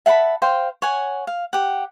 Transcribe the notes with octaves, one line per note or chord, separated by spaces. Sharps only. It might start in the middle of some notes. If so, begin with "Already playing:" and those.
E5 F#5 A5 B5
C5 F5 G5
C#5 F#5 G#5
F5
G4 F#5